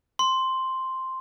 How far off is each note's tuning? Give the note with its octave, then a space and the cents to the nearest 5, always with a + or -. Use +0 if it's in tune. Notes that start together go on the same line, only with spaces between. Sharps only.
C6 +0